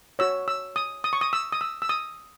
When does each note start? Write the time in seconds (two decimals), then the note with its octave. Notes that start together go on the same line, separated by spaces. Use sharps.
0.19 F#4 C#5 E6
0.48 E6
0.76 D#6
1.04 D#6
1.13 C#6
1.21 D#6
1.33 E6
1.52 D#6
1.61 E6
1.82 E6
1.89 D#6